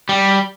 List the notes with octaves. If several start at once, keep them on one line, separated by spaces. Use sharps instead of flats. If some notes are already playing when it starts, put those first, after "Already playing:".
G3